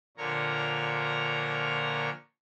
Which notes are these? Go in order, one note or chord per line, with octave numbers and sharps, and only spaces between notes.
A#2 D3 F3 A#4 C#5 A#5